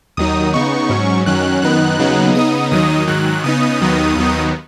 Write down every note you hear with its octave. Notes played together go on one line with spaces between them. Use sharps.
D#2 D#3 F#3 D#4 D#6
C#3 B3 D#4 C#6
G#2 F#3 C#4
F#2 D#3 F#3 C#4 F#6
F#2 D#3 B3 D#4 F#6
D#2 C#3 F#3 B3 D#4
C#3 B3 D#4 D#6
D#2 D#3 F#3 D#4 D#6
G#2 D#3 F#3 F#6
C#3 B3 D#4 D#6
D#2 D#3 F#3 B3 D#4
D#2 D#3 F#3 B3 D#4